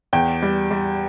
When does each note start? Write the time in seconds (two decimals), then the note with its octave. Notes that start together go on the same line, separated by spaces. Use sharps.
0.13 E2 G5
0.42 G3
0.71 G3